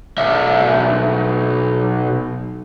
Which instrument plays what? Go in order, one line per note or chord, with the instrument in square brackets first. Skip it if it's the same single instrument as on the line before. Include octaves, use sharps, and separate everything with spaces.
[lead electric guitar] B1 E5